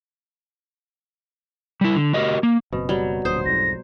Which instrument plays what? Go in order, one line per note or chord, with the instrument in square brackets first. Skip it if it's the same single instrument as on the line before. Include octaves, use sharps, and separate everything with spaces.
[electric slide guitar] G3 E4
D3
F#4 G4 A#4 D#5
A#3
[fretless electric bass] F#1 C4 [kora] B2
[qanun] F#3 [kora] G3
[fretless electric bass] D1 A#1 [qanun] C5 [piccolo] D#6
[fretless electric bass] B1 F2 G#2 [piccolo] A#6